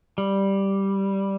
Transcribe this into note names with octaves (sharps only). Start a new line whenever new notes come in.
G3